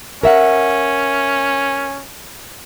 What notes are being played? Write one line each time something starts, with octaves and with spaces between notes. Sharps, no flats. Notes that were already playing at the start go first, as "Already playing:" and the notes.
C#4 A#4 E5 F#5